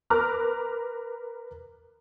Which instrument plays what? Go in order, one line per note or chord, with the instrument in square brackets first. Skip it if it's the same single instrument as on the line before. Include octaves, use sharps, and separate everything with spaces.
[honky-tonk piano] A#4 B4 A#5 D6 F6 F#6